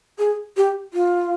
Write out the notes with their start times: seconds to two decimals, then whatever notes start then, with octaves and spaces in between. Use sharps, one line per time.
0.19 G#4
0.57 G4
0.93 F4